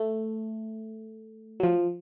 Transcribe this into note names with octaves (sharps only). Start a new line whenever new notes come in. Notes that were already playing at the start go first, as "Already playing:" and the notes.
Already playing: A3
F#3
F3